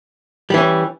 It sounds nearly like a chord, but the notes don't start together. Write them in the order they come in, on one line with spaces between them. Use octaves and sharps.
G3 E3 C#4